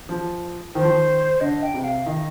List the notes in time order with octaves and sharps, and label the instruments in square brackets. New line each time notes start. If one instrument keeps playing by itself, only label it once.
[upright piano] F3
[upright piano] D#3 [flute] C5
[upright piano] F3
D#3
[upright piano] D3 [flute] D#5
[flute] G5
[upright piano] C3
[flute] F5
[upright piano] D#3 [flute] D#5